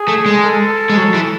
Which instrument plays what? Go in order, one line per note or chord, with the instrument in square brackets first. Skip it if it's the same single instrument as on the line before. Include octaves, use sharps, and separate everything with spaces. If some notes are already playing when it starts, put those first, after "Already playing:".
Already playing: [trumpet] G#4
[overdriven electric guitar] A3
G#3
[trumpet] A4
[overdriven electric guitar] G#3
F#3
E3